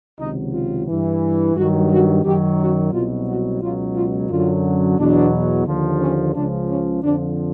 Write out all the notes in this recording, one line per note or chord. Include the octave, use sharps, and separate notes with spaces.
C#2 C3 D#3 F#3 D#4
F4
G2 E3
G2 D#3 F#3 F#4
F#4
F#2 D#3 F#3 G4
F#4
C2 B2 F#3 F4
F#4
C#2 B2 F#3 F4
F4
F#2 D3 F#3 F4
E2 B2 F#3 D4
D#2 D3 F3
C#4
C#2 C#3 F3 D4
C#4
F2 D3 F3 D4